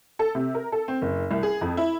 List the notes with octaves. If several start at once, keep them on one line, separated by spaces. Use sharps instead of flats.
A4
C3
A#4
A4
C4
F#1
C2
G#4
F2
E4